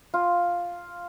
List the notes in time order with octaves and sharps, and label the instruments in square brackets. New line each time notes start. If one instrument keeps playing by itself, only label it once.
[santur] F4